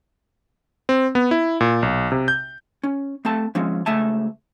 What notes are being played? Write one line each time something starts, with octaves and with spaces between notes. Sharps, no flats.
C4
B3
E4
A#2
B1
C3
G6
C#4
A3 C4 A4 A5
F3 G#3 C4 C#4
C#2 A3 E5 G#5 A5